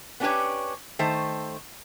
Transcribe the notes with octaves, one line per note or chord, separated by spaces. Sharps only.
B3 C#4 D4 G4 B4 C#5
D#3 A3 C5 A5